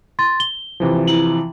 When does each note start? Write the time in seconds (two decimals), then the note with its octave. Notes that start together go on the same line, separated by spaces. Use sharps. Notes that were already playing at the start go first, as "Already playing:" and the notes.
0.19 C6 A6
0.40 G7
0.80 C3 E3 F3
1.07 E4 F#7